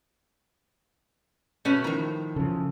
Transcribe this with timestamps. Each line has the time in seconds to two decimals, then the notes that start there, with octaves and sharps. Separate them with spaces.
1.65 B2 A3 C#4 B4 F7
1.84 A2 D#3 F3 A#4 A#5
2.36 C#3 F3 A4